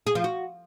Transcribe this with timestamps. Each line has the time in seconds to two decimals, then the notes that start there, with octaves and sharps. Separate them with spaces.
0.07 G#4
0.15 F3
0.24 F#4